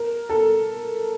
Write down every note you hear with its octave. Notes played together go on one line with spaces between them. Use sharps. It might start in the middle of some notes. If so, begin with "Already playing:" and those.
Already playing: A#4
A4